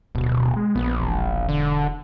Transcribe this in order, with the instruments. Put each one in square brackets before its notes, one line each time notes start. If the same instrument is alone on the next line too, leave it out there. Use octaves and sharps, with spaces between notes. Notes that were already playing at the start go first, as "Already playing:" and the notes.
[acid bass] D1 [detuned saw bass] B2
[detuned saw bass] G#3
[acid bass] A#1 [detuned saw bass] B3
[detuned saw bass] E1
[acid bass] D3